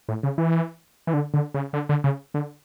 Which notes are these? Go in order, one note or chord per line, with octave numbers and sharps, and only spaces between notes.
A2
C#3
E3
E3
D3
D3
C#3
D3
D3
C#3
D3